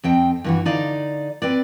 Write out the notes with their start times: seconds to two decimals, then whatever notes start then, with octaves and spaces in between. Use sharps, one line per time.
0.04 F2 C4 G5
0.44 G2 E3 F#4
0.65 D3 D#4 D5 F5
1.42 C4 B4 D5